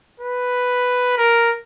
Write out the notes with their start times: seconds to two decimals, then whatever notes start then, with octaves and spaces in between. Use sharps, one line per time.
0.20 B4
1.17 A#4